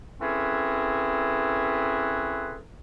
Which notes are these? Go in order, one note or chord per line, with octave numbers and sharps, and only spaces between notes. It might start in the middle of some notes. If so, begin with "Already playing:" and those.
C4 C#4 E4 G#4 A4 B4